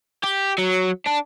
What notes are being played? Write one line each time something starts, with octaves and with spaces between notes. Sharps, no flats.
G4
F#3
D4